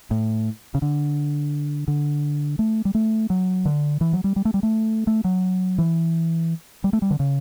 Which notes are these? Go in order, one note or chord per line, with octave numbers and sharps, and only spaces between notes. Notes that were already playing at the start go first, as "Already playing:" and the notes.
A2
C#3
D3
D3
A3
G3
A3
F#3
D3
E3
F#3
G3
G3
A3
G3
A3
A3
F#3
E3
G3
A3
G3
D3
C#3